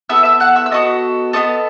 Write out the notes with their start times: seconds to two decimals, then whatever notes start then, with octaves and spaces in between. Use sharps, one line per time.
0.09 B3 E4 A4 E5 E6
0.25 E5 E6
0.40 F#5 F#6
0.56 E5 E6
0.66 E6
0.71 B3 F#4 A4 D#5 D#6
1.33 B3 F#4 A4 D#5 D#6